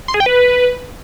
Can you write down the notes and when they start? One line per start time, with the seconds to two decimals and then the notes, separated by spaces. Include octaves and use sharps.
0.08 C6
0.14 G#4
0.20 G5
0.26 B4